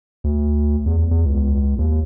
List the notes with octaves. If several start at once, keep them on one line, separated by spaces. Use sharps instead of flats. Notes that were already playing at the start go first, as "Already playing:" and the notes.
D2
E2
E2
C#2
D#2